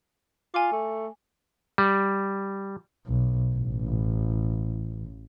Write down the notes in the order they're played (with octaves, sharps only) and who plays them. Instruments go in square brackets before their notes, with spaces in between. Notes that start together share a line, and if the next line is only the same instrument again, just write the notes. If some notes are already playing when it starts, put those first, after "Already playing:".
[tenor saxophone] F4 [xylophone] G#5 D6
[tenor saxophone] A3
[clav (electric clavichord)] G3
[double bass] B1
A1